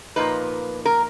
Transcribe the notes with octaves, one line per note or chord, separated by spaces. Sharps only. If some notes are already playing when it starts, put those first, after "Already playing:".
A#2 F3 A#3 D#4 B4
A#4